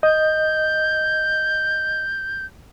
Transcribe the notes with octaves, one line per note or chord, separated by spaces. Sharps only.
D#5 G6